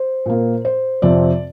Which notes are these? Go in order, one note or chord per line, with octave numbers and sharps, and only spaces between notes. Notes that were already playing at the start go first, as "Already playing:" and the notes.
Already playing: C5
A#2 A#3
C5
F2 C3 F3 C4 D5